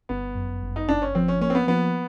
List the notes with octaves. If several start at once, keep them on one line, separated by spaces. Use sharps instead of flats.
G1 B3
F#2
G1
D#4
G1 D4
C#4
F3 C4
C#4
A#3 C#4
C4
B3
F3 B3